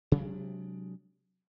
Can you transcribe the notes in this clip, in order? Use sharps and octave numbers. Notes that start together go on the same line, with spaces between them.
C3 F#3 G#3 D4